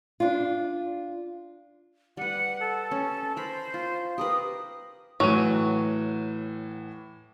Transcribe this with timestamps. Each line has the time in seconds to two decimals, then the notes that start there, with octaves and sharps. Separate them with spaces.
0.20 D4 F4
2.17 G3 B4 F#5
2.60 A4
2.91 C#4
3.37 A#4 C5 B5
3.74 F4
4.18 G4 A#4 B4 D#6
5.20 A2 E3 F#3 D#7